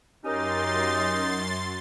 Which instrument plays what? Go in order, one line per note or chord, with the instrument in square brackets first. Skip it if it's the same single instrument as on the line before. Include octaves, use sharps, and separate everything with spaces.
[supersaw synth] F#2 C6 A6 [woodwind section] C#4 G4 A#4 [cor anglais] D#4